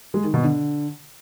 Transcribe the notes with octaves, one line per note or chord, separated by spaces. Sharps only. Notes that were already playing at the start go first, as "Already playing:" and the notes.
G#3
D#3
B2
D3